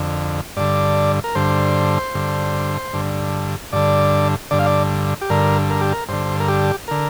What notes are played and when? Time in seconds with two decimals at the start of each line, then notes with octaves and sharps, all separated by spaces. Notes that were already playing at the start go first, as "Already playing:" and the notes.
Already playing: F2 D3
0.57 G2 D3 D5
1.24 A#4
1.35 G2 D3 C5
2.15 G2 D3
2.93 G2 D3
3.73 G2 D3 D5
4.51 G2 D3 D5
4.59 F5
4.66 D5
5.21 G4
5.30 G2 D3 A#4
5.70 A#4
5.81 G4
5.93 A#4
6.09 G2 D3 C5
6.40 A#4
6.48 G4
6.88 D3 A#4